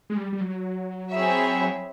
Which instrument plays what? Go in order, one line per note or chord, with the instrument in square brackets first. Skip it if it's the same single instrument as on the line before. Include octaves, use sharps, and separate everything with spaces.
[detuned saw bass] G#3
G3
G3
F#3
[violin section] C4 E4 G#4 C#5 E5